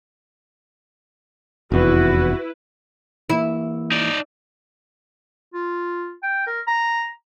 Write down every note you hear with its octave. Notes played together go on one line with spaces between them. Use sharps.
F1 E2 E4 F#4 B4
E3 A#3 E4
D#4 D5
F4
G5
A#4
A#5